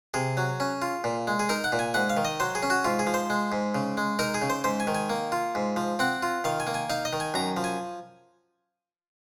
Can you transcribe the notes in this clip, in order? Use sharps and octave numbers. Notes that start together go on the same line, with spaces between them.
C3 G#4
F#3
C#4
F4
A#2
G#3
G#4
D#4 A#4
F#5
A#2
G#5
G#2 F#5
F5
D#3
D#5
F#3 C5
G#4
C#4
F#4
G#2 F4
G#4
F3
C5
G#3
G#2
C#3
G#3
D#4 A#4
G#4
C#3
C5
G#2 C5
G#5
D#3
G#5
A#3
F4
G#2
F3
C4 F#5
F4
D#3 F5
G#5
A#3
G#5
D#4 F5
D#5
D#3
G#5
F#2 A#5
F3
G#5